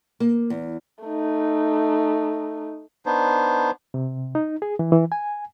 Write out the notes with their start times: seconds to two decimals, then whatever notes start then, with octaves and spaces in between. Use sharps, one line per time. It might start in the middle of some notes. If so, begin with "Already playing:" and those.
0.20 A#3
0.50 E2
1.04 A3 D#4
3.06 B3 D4 D#4 C5
3.94 C3
4.35 D#4
4.62 G#4
4.79 E3
4.92 E3
5.12 G#5